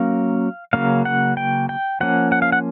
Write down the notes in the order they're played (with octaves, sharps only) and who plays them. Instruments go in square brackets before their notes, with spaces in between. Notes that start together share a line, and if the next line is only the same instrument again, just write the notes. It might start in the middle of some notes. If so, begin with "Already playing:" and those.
Already playing: [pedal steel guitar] F#3 A#3 C#4 F5
C#3 F#3 A#3 C#4 F5
F#5
G5
G5
F3 A#3 C#4 F#5
F#5
F5
F#5